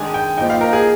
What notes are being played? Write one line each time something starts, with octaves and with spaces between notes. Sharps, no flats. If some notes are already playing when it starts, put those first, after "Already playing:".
Already playing: D#3 G#3 D4 G#5
G5
F3 A#3 D#4 G5
F5
A#4
G#4